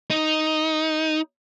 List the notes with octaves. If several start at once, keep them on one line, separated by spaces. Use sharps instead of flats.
D#4